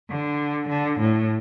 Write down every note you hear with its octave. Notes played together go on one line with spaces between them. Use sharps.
D3
D3
A2